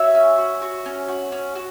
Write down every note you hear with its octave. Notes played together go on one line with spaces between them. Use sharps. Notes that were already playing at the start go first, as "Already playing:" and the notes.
Already playing: F#4 C#5 E5
C#4
F#4
F#4
C#4
F#4
C#4
F#4